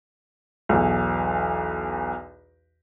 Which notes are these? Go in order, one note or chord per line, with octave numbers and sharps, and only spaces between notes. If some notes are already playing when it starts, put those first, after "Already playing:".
B1 E2